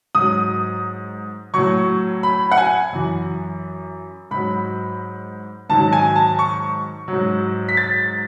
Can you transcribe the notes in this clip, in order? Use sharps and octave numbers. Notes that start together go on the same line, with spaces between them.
G#2 F#3 D#6
A2 F#3 C#6
B5
F#5
G#5
F#2 E3
G#2 F#3 B5
G#2 D#3 F#3 A5
G#5
A5
C#6
F#3
G#2
B6
A6